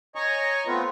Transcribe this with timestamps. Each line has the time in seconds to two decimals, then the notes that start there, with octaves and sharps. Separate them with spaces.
0.15 C#5 D#5 G#5 A#5 C#6
0.67 A3 B3 C4 F4 B4